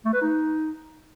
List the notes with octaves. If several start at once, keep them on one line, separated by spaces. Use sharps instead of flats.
A3
B4
D#4